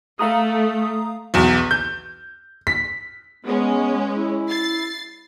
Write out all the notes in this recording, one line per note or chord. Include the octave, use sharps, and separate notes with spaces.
A3 F5 A#5 D#6
B1 E2
G6
B6
G#3 B3 C#4
E4
A6 C7